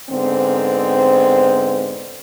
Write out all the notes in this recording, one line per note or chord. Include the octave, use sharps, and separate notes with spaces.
G#2 D3 B3 C4